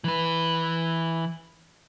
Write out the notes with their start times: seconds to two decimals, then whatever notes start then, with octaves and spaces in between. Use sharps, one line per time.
0.04 E3 B4